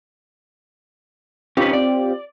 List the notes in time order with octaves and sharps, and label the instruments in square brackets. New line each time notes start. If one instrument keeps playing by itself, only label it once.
[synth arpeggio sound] C4 F4 G4 [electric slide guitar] C#4 D#4 B4
[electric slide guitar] D5